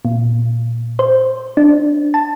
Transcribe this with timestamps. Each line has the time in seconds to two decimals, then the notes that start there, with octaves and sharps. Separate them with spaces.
0.05 A#2
0.99 C5
1.57 D4
2.14 A5